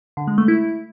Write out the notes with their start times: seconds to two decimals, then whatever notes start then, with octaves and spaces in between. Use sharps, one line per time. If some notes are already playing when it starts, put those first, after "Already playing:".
0.17 D3
0.27 G#3
0.38 A3
0.48 E4